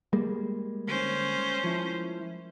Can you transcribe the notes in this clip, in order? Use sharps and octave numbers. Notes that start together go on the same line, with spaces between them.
G3 G#3 A#3
D2 C#4 C5
F3 E4